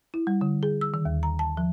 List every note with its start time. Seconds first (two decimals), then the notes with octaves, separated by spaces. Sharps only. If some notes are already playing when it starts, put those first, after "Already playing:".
0.14 E4
0.27 G3
0.41 D3
0.63 G#4
0.81 E6
0.94 D#3
1.05 D#2
1.23 A#5
1.39 A5
1.57 F3